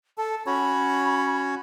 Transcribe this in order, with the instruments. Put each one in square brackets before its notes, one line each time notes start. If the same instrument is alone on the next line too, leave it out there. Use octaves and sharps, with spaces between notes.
[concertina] A4 [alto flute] A5
[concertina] C#4 F#4 C#5 [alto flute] B5